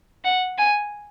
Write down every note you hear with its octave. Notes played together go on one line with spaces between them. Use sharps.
F#5
G#5